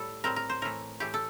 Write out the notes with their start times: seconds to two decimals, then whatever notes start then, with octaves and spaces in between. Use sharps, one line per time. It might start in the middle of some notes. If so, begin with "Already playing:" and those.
Already playing: A2 G3 A4
0.24 A2 G3 C4 A#4
0.36 A#4
0.50 C5
0.62 A2 E3 A3 A#4
1.00 A2 E3 A3 G4
1.14 A4